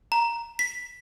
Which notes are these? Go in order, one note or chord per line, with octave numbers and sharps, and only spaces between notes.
A#5
B6